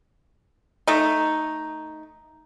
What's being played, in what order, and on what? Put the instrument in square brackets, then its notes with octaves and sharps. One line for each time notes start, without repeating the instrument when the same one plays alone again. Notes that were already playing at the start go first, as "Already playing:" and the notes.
[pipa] A3 D#4